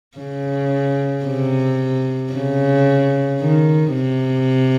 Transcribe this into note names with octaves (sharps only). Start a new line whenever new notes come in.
C#3
C3
C#3
D#3
C3